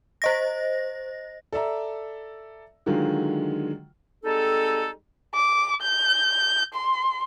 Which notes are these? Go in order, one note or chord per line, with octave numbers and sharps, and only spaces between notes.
C5 D#5 A#6
A4 D5 E5 A#5
D3 D#3 F#3 G#3 F4
G3 G#3 C4 D#4 A4
D6
G6
C6